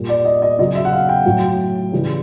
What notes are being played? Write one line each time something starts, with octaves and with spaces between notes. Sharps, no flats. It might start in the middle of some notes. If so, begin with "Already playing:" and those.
Already playing: A#2 G3
D5
D#5
D#5
C#3 F#3 D#5
E5
F#5
F5
G5
A2 F#3
C#3 E3 G3